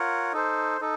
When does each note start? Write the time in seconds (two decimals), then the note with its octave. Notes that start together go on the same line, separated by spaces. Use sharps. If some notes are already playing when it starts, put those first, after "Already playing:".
Already playing: F4 A#4 C#5 F#5
0.33 D#4 A4 C5
0.81 D#4 A4